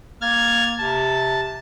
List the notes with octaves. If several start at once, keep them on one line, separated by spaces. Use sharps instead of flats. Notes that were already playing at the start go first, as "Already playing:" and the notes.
A#3 F6 G#6 A6
C3 A5